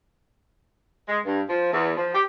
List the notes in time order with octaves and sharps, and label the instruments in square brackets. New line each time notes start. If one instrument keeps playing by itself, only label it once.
[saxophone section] G#3
G2
F3
E2
F3
G4